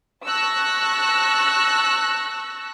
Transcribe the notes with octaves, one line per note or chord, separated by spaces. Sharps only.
A5 C#6 E6 F#6 A#6